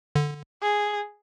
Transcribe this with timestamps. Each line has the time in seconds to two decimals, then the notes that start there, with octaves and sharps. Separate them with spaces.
0.15 D3
0.63 G#4